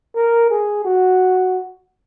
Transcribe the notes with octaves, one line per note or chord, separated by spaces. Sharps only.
A#4
G#4
F#4